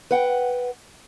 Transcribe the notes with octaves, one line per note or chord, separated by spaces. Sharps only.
B4 F#5 G5